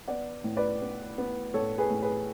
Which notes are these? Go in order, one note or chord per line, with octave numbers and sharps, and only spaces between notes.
B3 D5 F#5
A2
B4 D5
B3
B3
A2 A4 C#5
G#4 B4
A2
G#4 B4